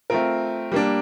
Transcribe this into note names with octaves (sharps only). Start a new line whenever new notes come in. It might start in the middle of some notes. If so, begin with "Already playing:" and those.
A3 C4 F4 A#4
G3 A#3 D4